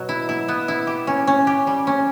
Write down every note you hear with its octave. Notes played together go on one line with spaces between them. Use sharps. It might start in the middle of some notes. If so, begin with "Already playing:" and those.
Already playing: B2 F#3
E4
E4
B3
E4
G4
C#4
C#4
G4
G3
C#4